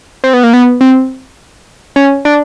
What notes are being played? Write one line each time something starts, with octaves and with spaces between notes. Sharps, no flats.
C4
B3
A#3
B3
C4
C#4
D4